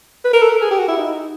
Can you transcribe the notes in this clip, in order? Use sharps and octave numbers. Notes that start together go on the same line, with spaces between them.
B4
A#4
A4
A#4
G#4
G4
F#4
E4
D#4